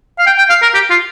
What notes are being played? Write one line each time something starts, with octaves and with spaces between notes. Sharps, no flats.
F5
G5
G5
F5
A#4
G4
F4